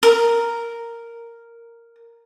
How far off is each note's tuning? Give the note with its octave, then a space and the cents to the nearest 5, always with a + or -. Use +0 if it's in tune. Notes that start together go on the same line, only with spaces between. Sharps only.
A#4 -5